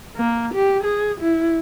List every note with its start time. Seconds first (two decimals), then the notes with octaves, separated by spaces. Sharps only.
0.16 A#3
0.54 G4
0.83 G#4
1.21 E4